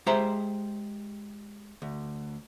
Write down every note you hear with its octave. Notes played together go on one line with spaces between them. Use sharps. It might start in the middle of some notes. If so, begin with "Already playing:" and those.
G#3 G4 C5 E5 A#5
D2